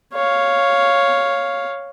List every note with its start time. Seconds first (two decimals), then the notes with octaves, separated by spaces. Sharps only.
0.13 C#5 F5